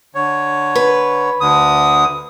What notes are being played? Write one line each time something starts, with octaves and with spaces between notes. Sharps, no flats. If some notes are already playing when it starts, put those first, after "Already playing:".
D3 C#5
B4
D2 D3 D#6